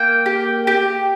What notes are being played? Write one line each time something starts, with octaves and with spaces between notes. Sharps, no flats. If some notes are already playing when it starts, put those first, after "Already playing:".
Already playing: A#3 G5
G4
G4